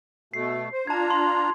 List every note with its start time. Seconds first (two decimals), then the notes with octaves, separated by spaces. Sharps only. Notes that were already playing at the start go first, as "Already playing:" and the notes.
0.34 B2 A3 C7
0.72 C5
0.87 D4 F4 A5 A#5 G#6
1.10 C6